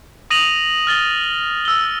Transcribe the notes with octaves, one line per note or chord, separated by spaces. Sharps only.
D#6 A#6 D#7 F7 F#7
F6 A6 G7
E6 G7